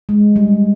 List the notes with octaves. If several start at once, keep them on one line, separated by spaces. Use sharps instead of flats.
G#3
G3